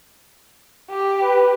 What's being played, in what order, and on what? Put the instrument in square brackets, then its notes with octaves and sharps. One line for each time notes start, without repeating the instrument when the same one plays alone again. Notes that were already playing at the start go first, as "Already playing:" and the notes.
[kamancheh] G4
[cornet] B4